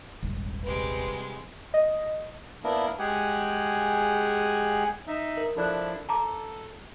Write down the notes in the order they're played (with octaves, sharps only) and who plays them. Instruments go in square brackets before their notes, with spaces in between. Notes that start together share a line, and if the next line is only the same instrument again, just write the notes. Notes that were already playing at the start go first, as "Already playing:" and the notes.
[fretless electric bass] D#1 G#1
[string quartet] C3 G3 G#3 [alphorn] B4
[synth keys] D#5
[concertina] A#3 B3 D4 E4 A#4
G#3 G4 G#4 F#5 G#5
[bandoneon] D#4 E5
[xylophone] A#4
[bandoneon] F3 D4 E4 [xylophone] A4 D5 F#6
[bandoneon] A4 [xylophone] A5 A#5 D6